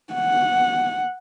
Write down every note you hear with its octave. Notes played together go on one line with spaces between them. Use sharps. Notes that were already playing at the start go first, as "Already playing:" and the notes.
F#5